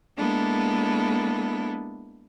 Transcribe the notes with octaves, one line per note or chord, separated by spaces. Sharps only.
G#3 A#3 B3 D4 E4 A4